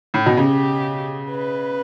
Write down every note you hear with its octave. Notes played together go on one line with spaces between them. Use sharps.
A2
B2
C#3 G4
B4